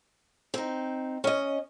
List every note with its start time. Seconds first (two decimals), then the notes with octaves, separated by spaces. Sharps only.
0.54 C4 D#4
1.24 C#4 D#5